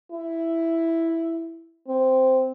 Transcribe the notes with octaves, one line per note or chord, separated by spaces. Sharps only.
E4
C4